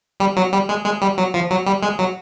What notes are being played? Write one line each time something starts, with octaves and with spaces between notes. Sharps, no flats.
G3
F#3
G3
G#3
G#3
G3
F#3
F3
F#3
G3
G#3
F#3